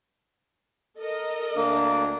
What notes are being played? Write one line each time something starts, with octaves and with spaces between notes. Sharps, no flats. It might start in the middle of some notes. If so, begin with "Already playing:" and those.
A4 A#4 D#5
D2 A#3 D4